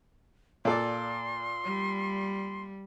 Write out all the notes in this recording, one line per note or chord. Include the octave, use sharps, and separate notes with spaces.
A#2 A4 D5 C6
G3